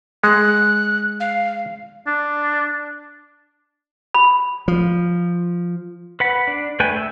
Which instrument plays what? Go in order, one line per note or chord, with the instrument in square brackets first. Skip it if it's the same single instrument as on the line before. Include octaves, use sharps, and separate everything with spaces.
[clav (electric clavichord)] G#3 [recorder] F#6
[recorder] F5
[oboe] D4
[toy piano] B5
[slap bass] F3
[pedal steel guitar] B4 F#5 B5
D4
A3 B4 G5 G#5
E5